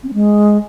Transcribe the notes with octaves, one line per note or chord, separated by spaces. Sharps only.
C4
C#4
G#3